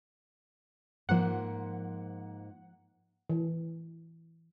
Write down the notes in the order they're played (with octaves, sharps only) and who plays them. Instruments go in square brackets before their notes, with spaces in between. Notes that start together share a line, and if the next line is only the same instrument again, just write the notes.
[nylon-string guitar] G#2 A#3 C5 [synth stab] F3 F#5
[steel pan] E3